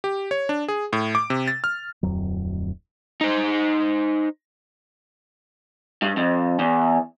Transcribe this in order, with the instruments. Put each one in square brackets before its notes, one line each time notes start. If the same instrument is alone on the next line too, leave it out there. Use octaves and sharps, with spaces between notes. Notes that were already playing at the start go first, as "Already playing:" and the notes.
[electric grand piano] G4
C#5
D4
G#4
A2
D6
C3
A6
F6
[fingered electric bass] D1 F2 F#3
[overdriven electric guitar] D#4 C5
[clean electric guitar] G2
F2
E2